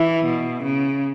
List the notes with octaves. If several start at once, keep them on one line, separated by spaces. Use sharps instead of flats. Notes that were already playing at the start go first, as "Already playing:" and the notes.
Already playing: E3 E4
B2
C#3